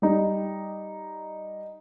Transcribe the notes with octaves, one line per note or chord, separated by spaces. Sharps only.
G3 D#4